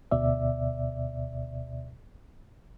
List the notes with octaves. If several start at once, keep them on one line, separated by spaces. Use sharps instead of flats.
D2 B2 D5 E5